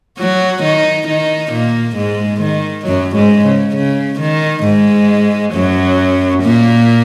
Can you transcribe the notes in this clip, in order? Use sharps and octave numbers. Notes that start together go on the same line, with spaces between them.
F#3 F#4
D#3 D#4
D#3 D#4
A#2 A#3
G#2 G#3
D#3
F#2 F#3
G#2 G#3
C#3
C#3
D#3
G#2 G#3
F#2 F#3
A#2 A#3